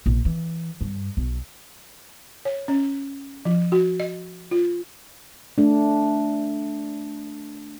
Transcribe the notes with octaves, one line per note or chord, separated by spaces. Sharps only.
A#1
E3
G2
B1
C#5
C#4
F3
F#4
D#5
F4
A3 D4